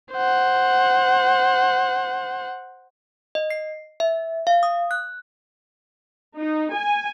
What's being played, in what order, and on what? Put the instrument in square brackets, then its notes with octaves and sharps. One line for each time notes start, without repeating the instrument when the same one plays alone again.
[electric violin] C5 F#5
[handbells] D#5
C7
E5
F5
D#6
F#6
[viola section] D#4
G#5